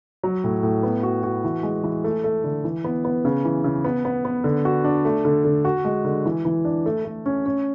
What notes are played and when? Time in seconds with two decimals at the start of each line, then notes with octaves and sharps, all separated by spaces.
0.23 F#3
0.44 A2
0.63 A2
0.83 B3
1.03 F#4
1.23 F#4
1.44 E3
1.63 G#3
1.84 E3
2.04 A3
2.24 A3
2.44 D3
2.64 E3
2.84 B3
3.05 B3
3.25 C#3
3.45 E3
3.64 C#3
3.84 B3
4.05 B3
4.25 B3
4.44 D3
4.65 F#4
4.84 D4
5.05 A3
5.25 D3
5.44 D3
5.65 F#4
5.85 G#3
6.05 D3
6.26 E3
6.45 E3
6.65 D4
6.86 A3
7.05 A3
7.26 C#4
7.46 C#4